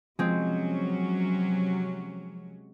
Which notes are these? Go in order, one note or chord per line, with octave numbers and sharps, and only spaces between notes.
C3 F3 F#3 G#3 C4 C#4